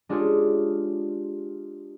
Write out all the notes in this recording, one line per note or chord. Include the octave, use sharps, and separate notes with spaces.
G#3 D4 F4 G4 G#4 C#5